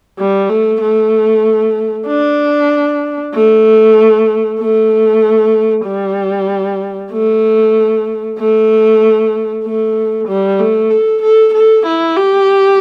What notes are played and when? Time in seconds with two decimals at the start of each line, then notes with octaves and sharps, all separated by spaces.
0.18 G3
0.50 A3
0.81 A3
2.07 D4
3.34 A3
4.60 A3
5.86 G3
7.12 A3
8.39 A3
9.65 A3
10.28 G3
10.60 A3
10.91 A4
11.22 A4
11.54 A4
11.86 E4
12.17 G4